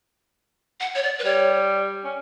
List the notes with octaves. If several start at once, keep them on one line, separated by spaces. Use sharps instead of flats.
F#5
C#5
D5
B4
G3 C#5
C#4